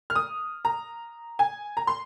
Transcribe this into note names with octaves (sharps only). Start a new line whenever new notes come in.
F6
D#6
A#5
G#5
A#5
C6